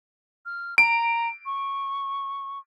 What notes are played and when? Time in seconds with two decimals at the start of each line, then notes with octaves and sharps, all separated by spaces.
0.46 F6
0.78 A#5 D7
1.46 C#6